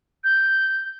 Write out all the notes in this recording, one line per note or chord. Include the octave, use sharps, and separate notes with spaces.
G6